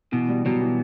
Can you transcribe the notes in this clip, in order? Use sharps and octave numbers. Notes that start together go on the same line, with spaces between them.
B2 E3
G3
B2 F#3
E3